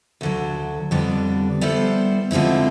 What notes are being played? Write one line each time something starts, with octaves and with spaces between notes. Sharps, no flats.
D2 D3 F#3
F2 D3 G3 B3 D4
G3 B3 E4 A4 C5
D3 F3 G#3 C4 E4